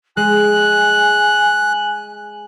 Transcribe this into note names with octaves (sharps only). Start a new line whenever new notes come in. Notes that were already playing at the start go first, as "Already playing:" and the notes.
G#3 G#5 F#6